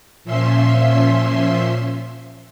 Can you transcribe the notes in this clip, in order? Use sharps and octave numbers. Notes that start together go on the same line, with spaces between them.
A#2 F3 C#4 E5 C6